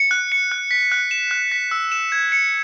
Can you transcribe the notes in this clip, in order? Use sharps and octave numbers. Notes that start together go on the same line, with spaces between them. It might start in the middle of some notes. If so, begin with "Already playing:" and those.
Already playing: C#7
F#6
C#7
F#6
B6
F#6
E7
F#6
B6
E6
E7
G#6
C#7